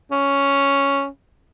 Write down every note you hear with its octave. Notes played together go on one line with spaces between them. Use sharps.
C#4